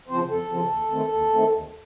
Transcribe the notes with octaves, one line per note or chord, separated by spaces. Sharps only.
C#3 F3 C4 C5
F2 A4
C#3 F3 C4
D#2
D#3 A3 C4
D#2
D#3 A3 C4
D#2